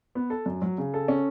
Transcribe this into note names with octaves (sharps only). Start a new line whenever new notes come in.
B3
A4
F#2
F#3
C#3
A4
C#4